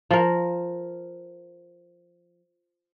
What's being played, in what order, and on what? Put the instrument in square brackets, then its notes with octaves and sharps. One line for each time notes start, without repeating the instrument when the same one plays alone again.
[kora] F3 A#4